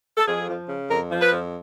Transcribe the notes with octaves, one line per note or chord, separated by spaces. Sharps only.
A4
F2 G#4
F3
C#3
F2 A#4
F3
B4
F2